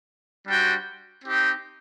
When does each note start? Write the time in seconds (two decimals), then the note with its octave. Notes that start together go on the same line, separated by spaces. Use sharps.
0.47 G3 D4 F#4 C5 G5
1.25 C4 D#4 G4